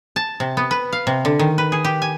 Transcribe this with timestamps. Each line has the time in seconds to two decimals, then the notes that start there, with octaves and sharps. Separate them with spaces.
0.16 A5
0.40 C3
0.57 B3
0.71 B4
0.93 F5
1.07 C3
1.25 D3
1.39 D#3
1.58 B4
1.72 G#4
1.85 G4
2.02 G#5